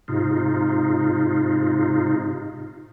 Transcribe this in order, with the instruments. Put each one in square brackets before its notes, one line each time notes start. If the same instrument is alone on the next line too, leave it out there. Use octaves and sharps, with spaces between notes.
[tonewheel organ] G#2 C3 D#4 F4